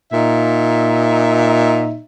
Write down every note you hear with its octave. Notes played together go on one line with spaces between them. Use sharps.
A#2 D#4 E5